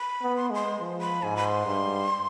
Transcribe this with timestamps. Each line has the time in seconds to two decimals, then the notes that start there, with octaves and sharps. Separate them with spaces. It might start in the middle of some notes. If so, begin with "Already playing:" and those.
Already playing: B5
0.22 B3
0.37 C6
0.50 G#3 C6
0.80 F3
1.01 B5
1.23 G#2 G#5
1.37 B5
1.45 C6
1.66 G2